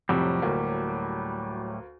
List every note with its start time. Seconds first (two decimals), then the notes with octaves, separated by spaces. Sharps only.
0.09 F2 A2 C3 F#3 G3
0.42 D2 A#3